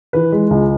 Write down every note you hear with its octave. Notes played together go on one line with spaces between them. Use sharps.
E3 B4
G#3
C#2